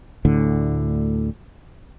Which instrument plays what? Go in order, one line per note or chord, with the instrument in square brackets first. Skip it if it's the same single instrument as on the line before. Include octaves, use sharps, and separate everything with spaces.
[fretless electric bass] D2 A2 D3